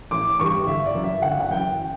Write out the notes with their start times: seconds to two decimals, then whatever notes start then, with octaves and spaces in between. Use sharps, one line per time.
0.11 A1 D6
0.39 G2 E3 G3 C#6
0.67 G1 E5
0.86 D5
0.95 F#2 E3
1.04 E5
1.22 G1 F#5
1.40 F#5
1.51 F#2 E3 G5